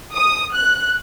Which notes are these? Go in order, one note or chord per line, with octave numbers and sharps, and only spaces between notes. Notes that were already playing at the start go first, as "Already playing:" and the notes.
D#6
F#6